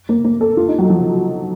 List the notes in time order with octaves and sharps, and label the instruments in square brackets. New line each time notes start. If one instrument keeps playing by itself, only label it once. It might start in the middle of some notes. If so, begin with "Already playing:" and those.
[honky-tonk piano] A#3
A#3
A4
F4
D#4
F#3
F3